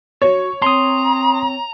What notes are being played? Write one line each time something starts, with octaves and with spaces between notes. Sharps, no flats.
F#4 C#5 C#6
C4 A#5 C6 D#6